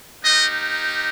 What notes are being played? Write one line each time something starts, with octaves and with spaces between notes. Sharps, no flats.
A#3 D#4 G4 D#5